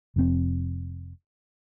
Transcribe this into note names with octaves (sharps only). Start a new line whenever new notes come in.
F1 F2 C3 C4